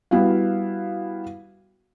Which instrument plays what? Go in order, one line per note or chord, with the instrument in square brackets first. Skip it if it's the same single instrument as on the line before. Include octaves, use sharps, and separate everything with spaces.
[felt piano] G3 B3 E4 F#4 F5